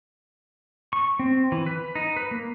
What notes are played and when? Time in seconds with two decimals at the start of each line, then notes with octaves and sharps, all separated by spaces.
0.93 C#6
1.19 C4
1.52 E3
1.66 B4
1.95 D#4
2.17 B4
2.31 A#3